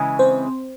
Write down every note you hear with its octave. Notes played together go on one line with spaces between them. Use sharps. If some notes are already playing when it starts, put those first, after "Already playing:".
Already playing: C#3 E3 G#3
C4 C5